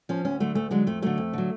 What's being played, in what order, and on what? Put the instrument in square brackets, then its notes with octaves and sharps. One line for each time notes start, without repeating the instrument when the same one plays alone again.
[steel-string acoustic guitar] F3 C#4
D2 C#4
D3 F#3 A3
D2 A3
D3 F#3 G#3
F2 A3
D3 F#3 A3
F2
D3 F#3